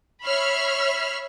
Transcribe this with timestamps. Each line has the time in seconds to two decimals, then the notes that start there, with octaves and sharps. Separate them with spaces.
0.24 C#5 E5 B5 F6 C7